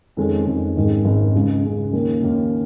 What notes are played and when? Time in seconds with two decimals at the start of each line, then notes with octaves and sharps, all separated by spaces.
0.17 F2 D#3 G#3 C#4
0.46 F2 D#3 G#3 C#4
0.76 G#1 G#2 D#3 G#3 C#4
1.05 G#1 G#2 D#3 G#3 C#4
1.35 C#2 C#3 G#3
1.64 C#2 C#3 G#3
1.93 D#2 D#3 A#3 C#4
2.22 D#2 D#3 A#3 C#4